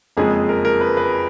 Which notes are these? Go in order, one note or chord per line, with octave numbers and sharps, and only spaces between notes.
F#1 F2 F3 G#3 G#4
A#4
A#4
B4
B4